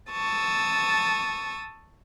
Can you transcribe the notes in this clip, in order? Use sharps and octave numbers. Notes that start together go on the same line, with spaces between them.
A5 C#6 D#6 E6